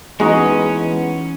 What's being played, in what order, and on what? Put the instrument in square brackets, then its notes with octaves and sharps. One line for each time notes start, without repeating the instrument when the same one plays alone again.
[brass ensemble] E3 B3 [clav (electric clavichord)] G#3 [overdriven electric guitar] C#4 [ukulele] D#4 F#4 D#5